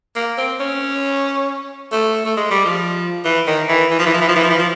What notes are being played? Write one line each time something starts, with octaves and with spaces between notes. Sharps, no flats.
A#3
C4
C#4
A3
A3
G#3
G3
F3
E3
D#3
E3
E3
F3
E3
F3
E3
F3
E3
F3
E3
F3